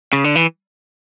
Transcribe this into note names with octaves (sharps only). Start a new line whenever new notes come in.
C#3
D3
E3